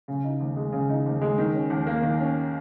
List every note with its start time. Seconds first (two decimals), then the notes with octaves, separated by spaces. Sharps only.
0.08 C#3
0.24 D#4
0.40 D#2
0.57 G#3
0.73 C#3
0.89 D#4
1.06 D#2
1.21 G#3
1.38 D#3
1.54 C#4
1.70 D#2
1.87 A#3
2.03 D#3
2.20 C#4